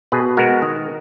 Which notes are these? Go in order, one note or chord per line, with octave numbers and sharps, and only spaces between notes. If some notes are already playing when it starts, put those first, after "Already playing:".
B2 G#4 B4
G#3 B3 F#4 A#4
D#3